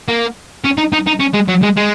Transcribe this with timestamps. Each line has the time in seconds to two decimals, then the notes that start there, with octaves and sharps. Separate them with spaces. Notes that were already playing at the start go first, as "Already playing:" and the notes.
0.08 A#3
0.64 C#4
0.77 D#4
0.92 D#4
1.07 D#4
1.20 C#4
1.34 G#3
1.48 F#3
1.63 G#3
1.77 G#3